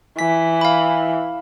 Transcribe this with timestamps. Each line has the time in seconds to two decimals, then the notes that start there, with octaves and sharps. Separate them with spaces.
0.19 E3 B6
0.61 F5 B5